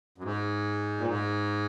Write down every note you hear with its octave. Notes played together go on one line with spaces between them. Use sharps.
F#2
G#2
A#2
G#2